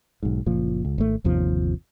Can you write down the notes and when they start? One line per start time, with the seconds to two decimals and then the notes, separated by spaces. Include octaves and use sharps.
0.23 B1 G#2
0.46 F#1 A#2 F3
0.85 C#2
0.98 G#1 A3
1.24 G1 D#2 C3 F3